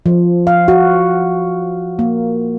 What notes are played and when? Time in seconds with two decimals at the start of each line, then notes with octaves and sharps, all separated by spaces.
0.06 F3
0.47 F5
0.68 F#4
1.99 A#3